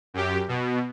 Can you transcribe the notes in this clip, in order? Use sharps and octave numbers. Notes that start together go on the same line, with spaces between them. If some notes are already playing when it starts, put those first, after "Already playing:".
F#2 G4
B2